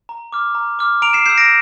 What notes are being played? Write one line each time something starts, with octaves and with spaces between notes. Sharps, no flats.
A#5
D6 F6
A#5
D6 F6
A#5 D7 F7
C7 E7
E6 G6 C7 E7
A#6 D7